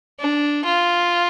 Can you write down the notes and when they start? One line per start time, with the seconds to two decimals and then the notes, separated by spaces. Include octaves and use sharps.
0.20 D4
0.65 F4